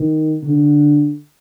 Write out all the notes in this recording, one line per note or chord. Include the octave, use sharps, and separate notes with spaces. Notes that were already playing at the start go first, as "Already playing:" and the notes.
Already playing: D#3
D3